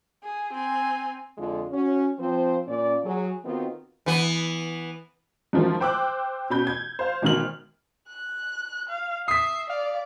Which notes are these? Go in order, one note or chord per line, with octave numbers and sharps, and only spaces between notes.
G#4
C4 G#5
F2 D3 G#3 F4
C#4 F#4
F3 C4 C5
A#2 C#4 D5
F#3 G#4
D#3 B3 C4 D#4 F4 F#4
E3 B3
F#2 D#3 F3 F#3 G#3
C5 G5 D6 E6 F#6
B2 C#4 B5 G6
G#6
C5 F5
G#1 B2 D#3 F6 F#7
F#6
F5
E5 D#6 B6 C7
D5 F5